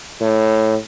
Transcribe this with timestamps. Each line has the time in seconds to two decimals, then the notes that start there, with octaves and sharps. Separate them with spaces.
0.21 A2